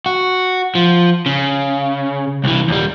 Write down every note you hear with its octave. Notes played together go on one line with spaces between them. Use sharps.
F#4
F3
C#3
C2 E3
D#2 G3